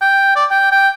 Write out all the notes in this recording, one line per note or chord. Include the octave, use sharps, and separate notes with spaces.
G5
D5
G5
G5